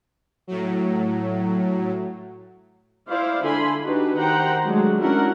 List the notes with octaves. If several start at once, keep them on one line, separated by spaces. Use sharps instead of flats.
A2 F#3
E4 C5 D5 F5
D3 E4 G#5 B5 C6
D4 D#4 F#4 G4 B4
D#3 G4 C5 F#5 G5 A#5
F#3 G#3 A3 D4 F#4
C#4 D4 E4 F#4 A#4 F#5